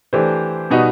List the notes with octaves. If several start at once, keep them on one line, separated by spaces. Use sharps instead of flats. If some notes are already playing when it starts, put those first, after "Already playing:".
E3 A3 D4 G4 C5
B2 G3 B3 D#4 F#4